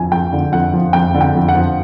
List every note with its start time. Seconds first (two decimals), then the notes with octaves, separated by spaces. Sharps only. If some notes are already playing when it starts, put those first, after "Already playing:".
Already playing: F2 D3 F3 G#5
0.12 F2 G5
0.33 D3
0.52 F2 F#5
0.74 F3
0.93 F2 G5
1.15 D3
1.21 G5
1.35 F2
1.48 F#5
1.55 F3